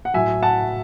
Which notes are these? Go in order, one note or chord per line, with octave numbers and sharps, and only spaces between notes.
F#5
A2 F#3 E5 G#5
F#5 A5